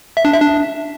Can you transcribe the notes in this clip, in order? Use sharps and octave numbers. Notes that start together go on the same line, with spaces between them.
E5
D4
E5
D4